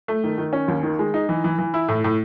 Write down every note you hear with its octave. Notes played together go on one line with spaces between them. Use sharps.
A3
D#3
D#3
C#4
D#2
D#3
G#3
D#4
E3
E3
E3
E4
A2
A2